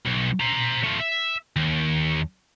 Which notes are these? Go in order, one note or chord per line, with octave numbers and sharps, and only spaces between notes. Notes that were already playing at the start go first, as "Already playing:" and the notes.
B1
C5 A#5
A3 F4
E5
D#2